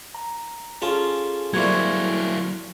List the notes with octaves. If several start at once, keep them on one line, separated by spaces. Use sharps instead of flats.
A#5
C#4 F4 G#4 A4 A5
F#3 G3 A#3 C4 E4 C#6 G#6